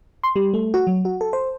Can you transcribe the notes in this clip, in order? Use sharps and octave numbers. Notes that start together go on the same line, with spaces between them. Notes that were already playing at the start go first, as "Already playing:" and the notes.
C6
G3
A3
F#4
F#3
F#4
A4
C5